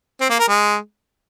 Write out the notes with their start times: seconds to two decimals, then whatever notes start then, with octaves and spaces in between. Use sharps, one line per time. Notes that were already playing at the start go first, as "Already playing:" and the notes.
0.21 C4
0.30 A#3
0.39 A#4
0.48 G#3